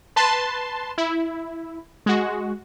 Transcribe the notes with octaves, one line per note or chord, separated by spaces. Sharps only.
B4 A5 C6
E4
G#3 F#4